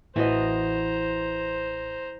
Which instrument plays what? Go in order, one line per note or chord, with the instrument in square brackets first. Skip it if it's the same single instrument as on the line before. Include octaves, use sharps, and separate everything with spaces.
[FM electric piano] A1 [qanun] E3 F#4 D#5 [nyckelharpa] C5 A#5